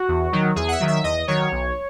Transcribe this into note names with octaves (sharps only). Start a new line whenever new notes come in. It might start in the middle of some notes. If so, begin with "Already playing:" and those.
Already playing: F#4
E2
D#3 F#3
E2 G#4
F#5
E5
D#3 F#3
E5
E2 D#5
D#3 F#3 C#5
B1